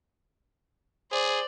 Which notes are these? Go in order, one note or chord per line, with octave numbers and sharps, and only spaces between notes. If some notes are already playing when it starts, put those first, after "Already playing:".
G#4 C5 D5